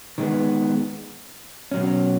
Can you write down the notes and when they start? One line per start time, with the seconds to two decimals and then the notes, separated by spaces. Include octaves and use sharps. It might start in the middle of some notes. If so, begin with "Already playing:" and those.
0.18 D#3 G#3 B3
1.71 B2 F#3 C#4